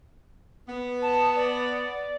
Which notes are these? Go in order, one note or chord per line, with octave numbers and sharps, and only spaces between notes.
B3
A5
D5